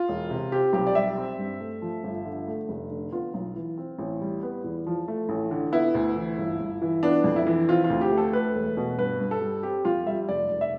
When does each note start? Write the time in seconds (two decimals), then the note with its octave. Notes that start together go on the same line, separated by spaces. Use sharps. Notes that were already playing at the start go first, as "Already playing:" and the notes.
Already playing: F4
0.08 E1
0.30 C3
0.52 C4 G4
0.73 B1 G4
0.87 D5
0.95 G3 E5
1.17 C4
1.38 G2
1.60 A3
1.82 F3
2.04 G1
2.25 D3
2.47 A3
2.69 F1
2.91 D3
3.12 B3 F4
3.34 B1
3.56 E3
3.78 C4
3.99 A1
4.21 G3
4.43 B3
4.64 E2
4.87 F3
5.08 A3
5.29 A1
5.51 D3
5.72 B3 E4
5.95 D2
6.16 E3
6.38 G1
6.60 G1
6.82 E3
7.03 B3 D4
7.24 F2
7.36 E4
7.47 E3
7.69 C4 F4
7.84 F4
7.90 D2
8.01 G4
8.11 A3
8.18 A4
8.33 A3 B4
8.55 E1
8.77 B2
8.98 G2 B4
9.20 G2
9.31 A4
9.41 G3
9.63 C4 G4
9.85 F2 F4
10.07 G3 E5
10.29 F1 D5
10.51 F1
10.61 E5